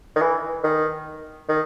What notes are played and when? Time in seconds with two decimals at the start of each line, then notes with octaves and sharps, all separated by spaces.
0.16 D#3
0.22 E3
0.64 D#3
1.49 D#3